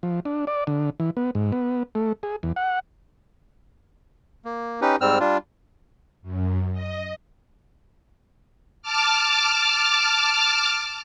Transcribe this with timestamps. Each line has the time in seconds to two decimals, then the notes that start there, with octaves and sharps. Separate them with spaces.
0.03 F3
0.25 D4
0.47 D5
0.67 D3
1.00 E3
1.17 B3
1.35 G#2
1.52 B3
1.95 A3
2.23 G#4
2.43 E2
2.56 F#5
4.45 A#3
4.81 C#4 D#4 G4 B4
5.01 G#2 G3 C4 E6 F6
5.20 G3 D4 F4
6.22 F#2
6.72 D#5
8.82 A5 D6 F6